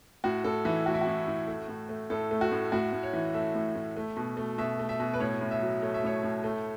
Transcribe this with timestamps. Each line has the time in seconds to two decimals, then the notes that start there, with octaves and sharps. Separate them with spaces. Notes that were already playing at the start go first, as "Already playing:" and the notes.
0.24 A2 F#4
0.44 A2 A4
0.65 E3 E4
0.86 A3 F#4
0.94 E4
1.01 F#4
1.07 A2
1.27 A2
1.47 A3
1.68 A2
1.89 A3
2.10 A2 A4
2.31 A3
2.41 F#4
2.51 A2
2.72 A2 F#4
2.93 A2
3.03 C#5
3.13 E3
3.34 A3 E5
3.55 A2
3.75 A2
3.97 A3
4.17 B2
4.37 A3
4.58 B2 E5
4.79 A3
4.89 E5
5.00 B2
5.14 B4
5.20 A2 C#5
5.41 A2
5.51 E5
5.62 F#3
5.82 A3 C#5
5.94 E5
6.03 A2 C#5
6.23 A2
6.44 A3